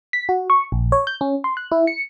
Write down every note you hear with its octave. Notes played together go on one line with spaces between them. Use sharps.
B6
F#4
C#6
A#1
C#5
G6
C#4
C6
F#6
E4
C#7